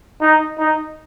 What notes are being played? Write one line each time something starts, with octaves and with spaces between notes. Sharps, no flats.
D#4
D#4